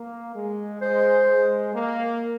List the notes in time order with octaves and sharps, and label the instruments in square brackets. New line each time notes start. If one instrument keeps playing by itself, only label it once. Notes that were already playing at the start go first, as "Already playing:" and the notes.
Already playing: [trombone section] A#3
G#3
[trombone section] G#3 [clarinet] C5
[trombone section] G#3
A#3